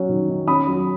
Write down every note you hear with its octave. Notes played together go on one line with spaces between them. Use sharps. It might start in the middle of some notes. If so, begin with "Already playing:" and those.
Already playing: F#3 C#4
D#3
D#3
C#4 B5 D#6
F#3